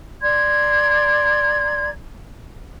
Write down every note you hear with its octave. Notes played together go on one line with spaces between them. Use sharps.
D5 A#5 C6 G#6